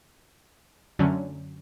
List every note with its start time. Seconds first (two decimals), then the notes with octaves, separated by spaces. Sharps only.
0.99 F#2 D3 F#3 A3 C#4